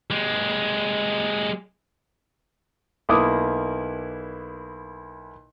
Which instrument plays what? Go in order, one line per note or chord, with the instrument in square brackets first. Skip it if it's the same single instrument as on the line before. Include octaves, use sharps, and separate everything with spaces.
[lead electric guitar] G#3 G4
[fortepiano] B1 A#3 E4 D6 D#6